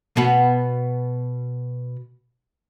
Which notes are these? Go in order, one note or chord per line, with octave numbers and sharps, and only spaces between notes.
B2 B3